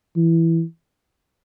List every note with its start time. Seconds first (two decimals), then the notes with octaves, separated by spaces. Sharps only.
0.16 E3